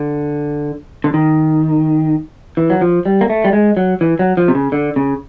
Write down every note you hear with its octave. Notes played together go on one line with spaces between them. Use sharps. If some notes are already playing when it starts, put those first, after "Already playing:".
Already playing: D3
D3
D#3
E3
F#3
F3
G3
A#3
A3
G3
G#3
F#3
E3
F#3
F3
C3
C#3
D3
C#3